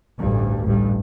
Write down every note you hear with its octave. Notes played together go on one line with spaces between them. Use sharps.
A1 D2 G2
A1 G2